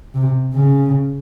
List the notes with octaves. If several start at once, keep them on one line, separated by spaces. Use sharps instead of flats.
C3
C#3